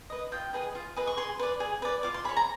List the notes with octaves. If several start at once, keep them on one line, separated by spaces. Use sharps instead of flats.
B4 D#5
F4 G5
G#4 B4 D#5
F4
G#4 B4 D#5
C#6
G#4 C6
B4 D5
G#4
B4 D5
F4 D6
C6
G#4 C#5 B5
A#5